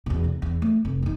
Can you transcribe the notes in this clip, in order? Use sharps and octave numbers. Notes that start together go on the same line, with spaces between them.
E2 B2
F1
E2
A3
F1
E2 D#4